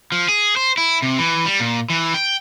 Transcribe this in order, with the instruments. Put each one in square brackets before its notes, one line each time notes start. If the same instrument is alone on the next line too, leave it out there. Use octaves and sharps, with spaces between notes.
[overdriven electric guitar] F3
G#4
C5
E4
C3
E3
G3
A#2
E3
G5